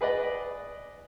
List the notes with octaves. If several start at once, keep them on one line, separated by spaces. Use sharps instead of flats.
G#4 B4 D5 D#5